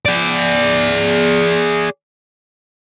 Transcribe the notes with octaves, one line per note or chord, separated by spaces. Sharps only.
G#4 D5